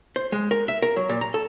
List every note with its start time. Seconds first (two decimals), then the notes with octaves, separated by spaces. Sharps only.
0.16 C5
0.32 G#3
0.51 A#4
0.68 E5
0.82 A#4
0.96 F#3
1.09 A#2
1.21 A#5
1.34 A4